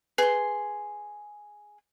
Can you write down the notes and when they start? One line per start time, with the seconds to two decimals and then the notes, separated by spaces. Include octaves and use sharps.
0.18 G#4 B4 C6